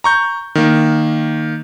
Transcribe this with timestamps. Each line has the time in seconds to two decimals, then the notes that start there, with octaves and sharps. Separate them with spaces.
0.04 A#5 C#6 G6
0.55 D#3 A#3